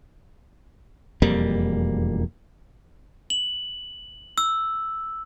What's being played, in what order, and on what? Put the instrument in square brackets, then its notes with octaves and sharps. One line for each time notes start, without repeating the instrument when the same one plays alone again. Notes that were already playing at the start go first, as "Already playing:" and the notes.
[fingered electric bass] E1 F2 G3 A#3
[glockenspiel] F#7
E6